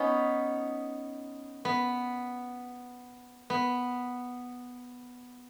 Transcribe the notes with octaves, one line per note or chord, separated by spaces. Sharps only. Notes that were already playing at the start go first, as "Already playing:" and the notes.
Already playing: B3 C#4 D#4
B3
B3